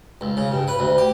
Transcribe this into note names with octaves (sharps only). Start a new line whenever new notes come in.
C#2
C#3
G2
B4
D2
G4